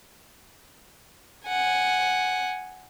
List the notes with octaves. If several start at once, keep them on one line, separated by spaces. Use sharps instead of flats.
F#5 G#5